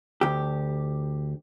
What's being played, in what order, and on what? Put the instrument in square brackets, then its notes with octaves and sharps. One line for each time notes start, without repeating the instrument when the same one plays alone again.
[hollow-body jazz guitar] D2 G4